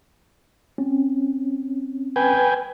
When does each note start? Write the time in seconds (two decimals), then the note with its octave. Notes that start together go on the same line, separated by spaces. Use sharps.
0.78 C4 C#4
2.16 B4 G5 G#5